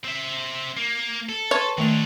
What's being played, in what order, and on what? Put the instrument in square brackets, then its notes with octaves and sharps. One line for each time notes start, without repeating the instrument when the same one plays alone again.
[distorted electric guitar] C4 E5
A#3
A4
[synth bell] B4 A5 C6 [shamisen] C#5
[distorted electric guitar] A#2 D4 [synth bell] D#3 A3 F7